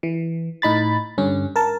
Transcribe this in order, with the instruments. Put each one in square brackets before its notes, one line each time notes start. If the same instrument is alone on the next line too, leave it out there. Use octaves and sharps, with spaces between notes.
[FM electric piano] E3
A2 D#4 B5 A6
G2 D3 C#4
A#4 A5